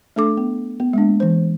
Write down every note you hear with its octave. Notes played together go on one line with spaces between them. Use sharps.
A3 D4 A4 D6
B3
B3
G#3 A#3 D4
E3 C5